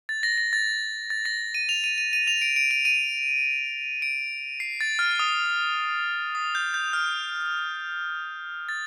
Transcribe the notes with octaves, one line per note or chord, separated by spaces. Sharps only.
A6
A#6
A#6
A6
A6
A#6
D#7
F7
D#7
D#7
D#7
F7
D7
D7
D#7
D#7
D7
C7
A6
F6
D#6
D#6
G6
G6
F6
A6